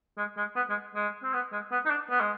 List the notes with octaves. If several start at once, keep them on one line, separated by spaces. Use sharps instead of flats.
G#3
G#3
B3
G#3
G#3
C4
B3
G#3
B3
D#4
D4
B3
G#3